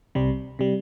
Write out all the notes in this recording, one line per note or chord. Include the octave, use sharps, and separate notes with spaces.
C2 C3 G3
C3 G3